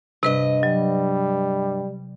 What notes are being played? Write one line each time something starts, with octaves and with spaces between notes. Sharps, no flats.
G2 C3 B4 D#5
F#3 G3